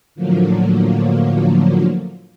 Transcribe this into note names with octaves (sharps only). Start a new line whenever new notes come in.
A2 D3 F3 F#3 A#3